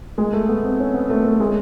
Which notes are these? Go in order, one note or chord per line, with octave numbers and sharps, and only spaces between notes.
G#3
A3
B3
C4
C#4
B3
A3
A3
G#3